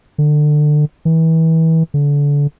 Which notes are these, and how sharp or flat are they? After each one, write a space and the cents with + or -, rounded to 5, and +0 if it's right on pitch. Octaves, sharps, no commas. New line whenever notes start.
D3 +25
E3 -30
D3 -30